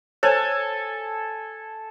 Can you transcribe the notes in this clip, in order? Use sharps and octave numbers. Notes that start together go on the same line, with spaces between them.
A4 C5 C#5 G#5